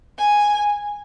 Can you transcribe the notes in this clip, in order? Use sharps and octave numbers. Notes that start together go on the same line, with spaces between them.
G#5